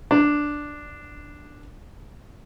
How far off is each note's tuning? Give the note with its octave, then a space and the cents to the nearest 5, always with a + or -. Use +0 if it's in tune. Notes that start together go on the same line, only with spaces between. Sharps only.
D4 +0